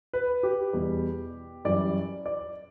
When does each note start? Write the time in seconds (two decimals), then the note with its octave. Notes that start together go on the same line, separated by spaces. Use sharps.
0.13 B4
0.43 G4
0.73 E2 B2 G3
1.65 F#2 E3 G3 D5
2.26 D5